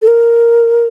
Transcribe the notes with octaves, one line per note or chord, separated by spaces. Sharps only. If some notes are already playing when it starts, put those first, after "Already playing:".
A4
A#4